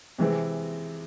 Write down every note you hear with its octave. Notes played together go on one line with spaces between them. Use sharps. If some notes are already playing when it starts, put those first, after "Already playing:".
C3 E3 G#3 C4